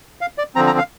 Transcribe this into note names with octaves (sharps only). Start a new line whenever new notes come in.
F5
D5
D3 F3 C4 A#5
A#5
F5